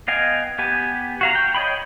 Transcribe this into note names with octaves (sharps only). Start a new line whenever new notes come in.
B3 D#5 F5 G5 G#5
B3 G4 G#5
F#4 F5 A#5
G5
C#5 D#5 G5 B5